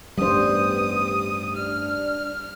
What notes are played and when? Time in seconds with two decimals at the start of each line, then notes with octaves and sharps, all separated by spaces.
0.18 A1 G2 G3 B3 C5 D#6
1.56 D4 F6